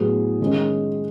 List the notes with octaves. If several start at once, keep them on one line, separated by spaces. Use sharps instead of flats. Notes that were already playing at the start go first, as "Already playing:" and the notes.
Already playing: A2 F#3 B3 G#4
D#3 G#3 C#4